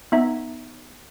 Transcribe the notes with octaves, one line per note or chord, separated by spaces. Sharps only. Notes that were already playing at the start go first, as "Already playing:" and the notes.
B3 D#4 E5 A#5